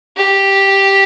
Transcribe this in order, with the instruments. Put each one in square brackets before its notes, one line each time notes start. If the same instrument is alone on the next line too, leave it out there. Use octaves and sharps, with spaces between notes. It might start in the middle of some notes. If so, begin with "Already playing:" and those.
[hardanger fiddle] G4